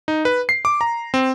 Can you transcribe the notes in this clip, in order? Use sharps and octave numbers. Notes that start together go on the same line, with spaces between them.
D#4
B4
C7
D6
A#5
C4